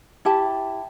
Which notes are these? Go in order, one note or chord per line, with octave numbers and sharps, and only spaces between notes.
E4 G4 A5